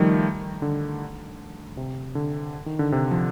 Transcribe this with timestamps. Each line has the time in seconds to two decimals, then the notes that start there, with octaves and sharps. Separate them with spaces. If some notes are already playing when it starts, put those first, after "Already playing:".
Already playing: D#3 F3 G3 A3
0.62 D3
1.77 C3
2.15 D3
2.66 D#3
2.79 D3
2.92 C3
3.11 F3